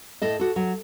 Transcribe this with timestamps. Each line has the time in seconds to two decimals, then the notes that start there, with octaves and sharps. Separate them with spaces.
0.22 A2 A4 D#5
0.40 F#4 A4
0.56 F#3